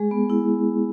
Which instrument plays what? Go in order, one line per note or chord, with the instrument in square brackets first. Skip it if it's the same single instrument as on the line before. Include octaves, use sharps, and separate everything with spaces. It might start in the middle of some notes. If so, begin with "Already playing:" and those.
Already playing: [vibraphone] G#3 G#4
B3
E4